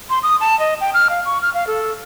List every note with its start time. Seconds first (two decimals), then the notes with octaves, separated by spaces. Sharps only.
0.10 C6
0.23 D#6
0.41 A5
0.59 D#5
0.81 G5
0.94 F6
1.10 F5
1.26 C#6
1.42 F6
1.54 F5
1.67 A4